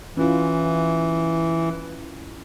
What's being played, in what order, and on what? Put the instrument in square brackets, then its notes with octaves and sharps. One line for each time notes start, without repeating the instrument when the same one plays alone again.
[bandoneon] E3 [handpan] C#4 E4 F4